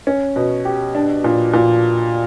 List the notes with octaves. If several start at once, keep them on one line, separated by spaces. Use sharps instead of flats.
C#4
B2
G4
D4
A#2
A#2